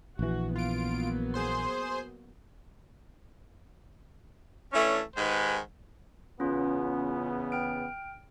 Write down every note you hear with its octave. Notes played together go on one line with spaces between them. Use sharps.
A#1 E3 F#4
F#3 A#3 B3 F4 D7
G#4 C5 C6
E3 A3 C#4 D4 C#5
G#2 D#3 G#3 G4 B4
E2 C#3 B3 C#4 F4
G5 F6 D7